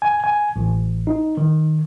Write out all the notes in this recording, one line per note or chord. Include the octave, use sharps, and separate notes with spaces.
G#5
G#5
A1
D#4
D#3